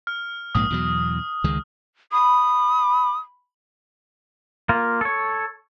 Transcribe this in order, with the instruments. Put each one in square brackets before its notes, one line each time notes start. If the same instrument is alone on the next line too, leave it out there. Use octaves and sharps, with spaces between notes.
[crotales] F6
[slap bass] A#1 G#2 A#3 [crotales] D#6
[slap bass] E2 B2 F#3
C#2 D#3 G#3
[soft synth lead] B5 [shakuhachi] D#6
[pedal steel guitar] A#3 F4
A4 C#5